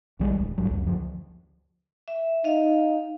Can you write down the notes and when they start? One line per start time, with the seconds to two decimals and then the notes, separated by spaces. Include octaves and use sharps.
0.19 B1 E3 G3 G#3
0.36 D1
0.58 D1 A1 G2 F#3
0.71 C#2 F#2
0.84 D2 F3
2.08 E5
2.44 D#4 D#5 F5